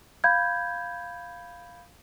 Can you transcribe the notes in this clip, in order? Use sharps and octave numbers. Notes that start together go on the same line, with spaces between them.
F5 B5 G6 G#6